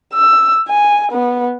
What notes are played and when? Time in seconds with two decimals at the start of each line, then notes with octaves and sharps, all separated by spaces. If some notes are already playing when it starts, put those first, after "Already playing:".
0.14 E6
0.68 G#5
1.12 B3